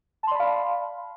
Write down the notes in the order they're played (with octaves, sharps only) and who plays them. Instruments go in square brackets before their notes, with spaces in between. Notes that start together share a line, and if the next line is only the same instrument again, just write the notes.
[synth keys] A5
C6
D5
B5
F5